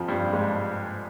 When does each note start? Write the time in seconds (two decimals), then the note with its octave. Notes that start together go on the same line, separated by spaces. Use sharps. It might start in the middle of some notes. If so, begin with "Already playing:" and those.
Already playing: F2 F3
0.08 G2 G3
0.33 G#2 G#3